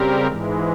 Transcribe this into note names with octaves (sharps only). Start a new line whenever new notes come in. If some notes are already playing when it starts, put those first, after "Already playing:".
Already playing: C#3 G3 C4 G4 A#4
G#2 E3 G#3